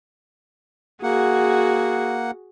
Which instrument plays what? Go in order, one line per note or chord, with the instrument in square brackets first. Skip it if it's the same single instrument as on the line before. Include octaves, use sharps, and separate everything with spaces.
[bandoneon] A#3 F#5 [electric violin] F#4 G#4